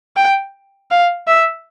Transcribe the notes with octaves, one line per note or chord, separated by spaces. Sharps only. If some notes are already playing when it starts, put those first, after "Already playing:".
G5
F5
E5